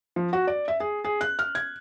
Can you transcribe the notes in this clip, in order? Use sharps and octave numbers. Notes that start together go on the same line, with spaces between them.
F3
F#4
D5
E5
G#4
G#4
F#6
F6
G#6